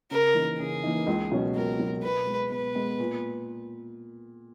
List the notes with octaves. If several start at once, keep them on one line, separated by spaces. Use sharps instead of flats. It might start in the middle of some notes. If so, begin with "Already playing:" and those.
C#3 A#4
E3 A#3 D#4
C#3 G#4
E3 A#3 D#4
C#2
B2 F#3 C#4
C#2 A#4
B2 F#3 C#4
B2 B4
G#3 B3
B2 B4
G#3 B3
A#2